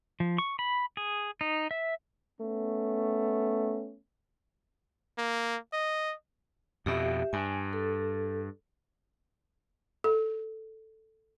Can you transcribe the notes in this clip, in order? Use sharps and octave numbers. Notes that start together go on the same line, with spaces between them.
F3
C#6
B5
G#4
D#4
E5
A3 B3 C#4
A#3
D#5
F2 B2 G4 E5
G2 G#5
A4
A4